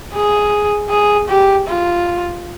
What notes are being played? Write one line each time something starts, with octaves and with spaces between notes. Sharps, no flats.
G#4
G#4
G4
F4